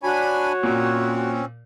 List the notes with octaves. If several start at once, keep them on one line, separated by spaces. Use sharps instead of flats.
D4 F#4 C#5 G#5 B5
A#2 C4 C#4